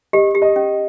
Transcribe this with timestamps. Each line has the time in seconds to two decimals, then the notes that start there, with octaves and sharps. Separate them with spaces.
0.13 G4 D#5
0.35 G4
0.42 D#5
0.56 C#4